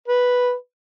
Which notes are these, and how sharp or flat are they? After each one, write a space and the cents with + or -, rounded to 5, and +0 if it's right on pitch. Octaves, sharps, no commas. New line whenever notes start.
B4 -5